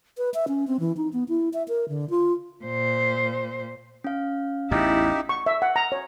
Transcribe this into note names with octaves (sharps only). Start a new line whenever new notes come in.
B4
E5
C#4
C4
E3
D#4
B3
E4
E5
A#4
D3
F4
A#2 C5
C#4 F5
A1 E2 D#4 E4 G4
C#6
E5
F#5
A#5
C#5